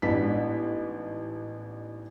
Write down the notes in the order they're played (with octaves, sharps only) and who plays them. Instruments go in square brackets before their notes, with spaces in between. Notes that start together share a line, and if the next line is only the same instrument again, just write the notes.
[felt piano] A1 G#2 B3 D4 B6